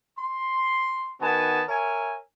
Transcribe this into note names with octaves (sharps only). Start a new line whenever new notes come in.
C6
D#3 B3 F#4 G#5 A5
A#4 C#5 E5 G#5